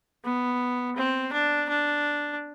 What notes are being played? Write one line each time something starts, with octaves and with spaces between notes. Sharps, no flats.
B3
C4
D4
D4